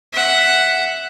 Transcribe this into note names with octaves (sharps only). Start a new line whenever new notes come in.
E5 F#5